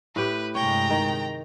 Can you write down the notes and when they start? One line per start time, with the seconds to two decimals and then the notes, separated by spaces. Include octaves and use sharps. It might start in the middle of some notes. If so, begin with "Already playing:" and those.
0.16 A2 G4 B4
0.55 G2 C3 G#3 C#5 G5 A#5
0.90 D#3